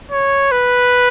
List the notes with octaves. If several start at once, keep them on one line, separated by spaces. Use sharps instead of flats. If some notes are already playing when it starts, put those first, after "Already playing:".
C#5
B4